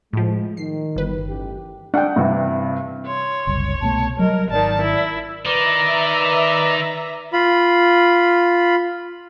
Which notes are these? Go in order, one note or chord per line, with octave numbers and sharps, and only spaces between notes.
A2 F3 G#3
D#3 C7
G1 B4
A1 G4
D4 F#5 G5
G2 C3 E3
C#5 C6
F#1 C2
C2 B2 A3 A5
F#3 G3 A#4 D#5
G#1 D#3 D5 A5
E4
D#3 D#4 B4 D5 E5 A#5
F4 B5